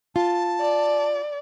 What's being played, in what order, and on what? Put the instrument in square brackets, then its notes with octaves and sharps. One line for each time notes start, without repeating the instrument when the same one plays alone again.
[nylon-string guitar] F4 [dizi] A5
[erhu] D5